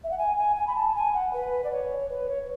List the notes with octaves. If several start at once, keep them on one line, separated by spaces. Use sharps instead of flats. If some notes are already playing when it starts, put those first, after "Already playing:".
E5
F#5
G#5
G#5
G#5
B5
A5
G#5
F#5
B4
D5
C#5
B4
C#5